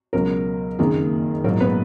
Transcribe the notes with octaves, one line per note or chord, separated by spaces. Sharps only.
C#2 B2 F#3 A#4
F#1 F2 D#3 A#3 G#4
A#1 G#2 F#3 A#3 A#4
B3 B4